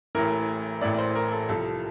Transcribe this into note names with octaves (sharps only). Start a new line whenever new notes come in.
A1 A2 E3 A#4
A1 A2 E3 D5
C5
A#4
A4
C2 C3 F3 A4